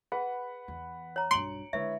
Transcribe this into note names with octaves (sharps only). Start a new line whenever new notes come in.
G#4 B4 F#5 B5
E2
C#5 A#5
B1 G2 C6 C#7 D7 F#7
D3 G#3 E4 B4 C#5 E5